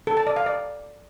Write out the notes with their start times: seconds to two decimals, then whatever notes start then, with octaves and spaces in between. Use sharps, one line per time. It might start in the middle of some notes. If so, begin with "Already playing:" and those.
0.07 A4
0.17 A5
0.27 D5
0.36 F5
0.46 D5